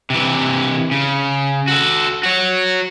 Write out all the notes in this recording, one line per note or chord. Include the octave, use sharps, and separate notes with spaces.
C3 E3
C#3
F#4 A4
F#4 C#5